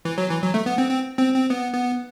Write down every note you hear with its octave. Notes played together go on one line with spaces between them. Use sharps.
E3
F#3
E3
F#3
A3
B3
C4
C4
C4
C4
B3
B3